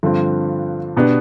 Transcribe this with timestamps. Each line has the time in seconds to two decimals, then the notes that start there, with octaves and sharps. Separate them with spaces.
0.03 G2 D3 F3 C4
0.96 B2 B3 D4 G4